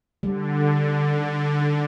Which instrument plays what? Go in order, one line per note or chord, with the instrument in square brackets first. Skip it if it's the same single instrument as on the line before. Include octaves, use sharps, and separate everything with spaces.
[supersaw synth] D3 [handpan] G3